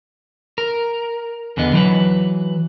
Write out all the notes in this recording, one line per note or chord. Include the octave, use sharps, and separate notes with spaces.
A#4
E2 D3 B3 D#5
E3 F#3 B4